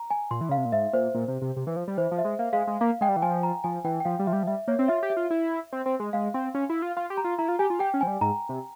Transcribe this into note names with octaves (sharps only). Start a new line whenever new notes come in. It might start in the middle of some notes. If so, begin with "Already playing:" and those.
Already playing: A#5
G#5
A#2 C6
E3
C#3 F5
C3
A#2
G#2 E5
A#2 C5
A#2
C3
C3
C3
E3
F3
G3
E3 C5
F3
E5
G#3
A#3 F5
G#3 F5
G#3
A#3 F5
G#3 G5
G3
E3
F3 G#5
A#5
F3 G#5
E3 G5
G5
F3 F5
G3
F3 E5
G3
F3
G3 E5
A#3 C#5
C4
F4 E5
G4
E5
F4
E4
C4
C4
G#3
G#3 F5
C4 C6
C#4
E4
F4
F4 C6
G4
A#5
F4
E4 A#5
F4
G4 G#5
F4
G4 G5
C#4
F3 G#5
G3
G#2 A#5
C3